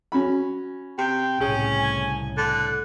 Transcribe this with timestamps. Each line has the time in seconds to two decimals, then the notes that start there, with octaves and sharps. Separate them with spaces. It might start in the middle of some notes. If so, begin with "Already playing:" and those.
0.12 C#4 F#4 B5
0.98 C3 G5
1.40 C2 A2 C#3 C#4 G#4
1.78 G#5
2.37 D3 F#6